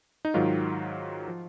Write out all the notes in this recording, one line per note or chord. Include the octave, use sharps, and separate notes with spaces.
D#4
G#2 D#3 F#3 F4
F3